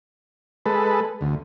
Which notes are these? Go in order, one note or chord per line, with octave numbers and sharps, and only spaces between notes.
G#3 A4 B4
D2